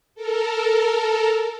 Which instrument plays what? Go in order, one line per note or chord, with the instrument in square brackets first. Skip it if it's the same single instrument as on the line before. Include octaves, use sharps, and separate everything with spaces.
[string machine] A4 A#4